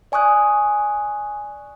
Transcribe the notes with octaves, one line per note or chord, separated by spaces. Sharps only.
D5 G#5 C#6 D#6 F#6